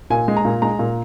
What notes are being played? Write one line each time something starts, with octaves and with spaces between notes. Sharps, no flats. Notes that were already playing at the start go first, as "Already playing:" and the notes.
A#2 G#5
G#3
A#5
A#2
G#3 A#5
A#2